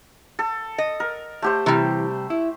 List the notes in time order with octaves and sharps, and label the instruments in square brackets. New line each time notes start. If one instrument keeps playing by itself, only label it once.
[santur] A4
[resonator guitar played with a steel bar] D#5
[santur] A#4
A3 G4 C5
[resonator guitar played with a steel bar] C3 G3 [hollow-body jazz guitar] E3
[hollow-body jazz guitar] E4